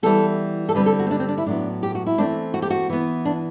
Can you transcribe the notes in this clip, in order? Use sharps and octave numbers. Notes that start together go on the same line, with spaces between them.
E3 G3 B3 A4
A4
D3 G3 C4 B4
A4
F#4
C4
D4
C4
D4
E4
A2 F#3 B3 D4
G4
F#4
E4
E3 A3 C4 D4
F#4
G4
F#4
E3 B3
D4